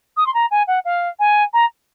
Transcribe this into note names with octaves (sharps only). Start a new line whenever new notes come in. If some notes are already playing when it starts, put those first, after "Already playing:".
D#6
C6
A#5
G#5
F#5
F5
G#5
A#5